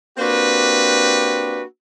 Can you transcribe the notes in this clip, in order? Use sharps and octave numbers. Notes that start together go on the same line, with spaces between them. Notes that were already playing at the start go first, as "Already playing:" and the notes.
A#3 C4 D4 F#4 G4 B4